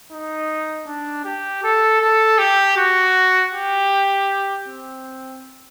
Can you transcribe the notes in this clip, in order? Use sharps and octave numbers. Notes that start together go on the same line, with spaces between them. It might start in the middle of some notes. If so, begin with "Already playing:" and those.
D#4
D4
G4
A4
A4
G4
F#4
G4
C4